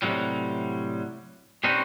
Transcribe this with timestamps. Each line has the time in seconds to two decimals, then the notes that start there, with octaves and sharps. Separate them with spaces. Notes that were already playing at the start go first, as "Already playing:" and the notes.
0.02 A2 C3 F#3 G3
1.64 B2 G3 C4 C#4 D#4 F#4